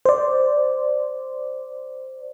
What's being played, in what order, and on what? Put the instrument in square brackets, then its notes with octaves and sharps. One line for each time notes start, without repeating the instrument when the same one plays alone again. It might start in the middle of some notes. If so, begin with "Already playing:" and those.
[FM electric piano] C5 D5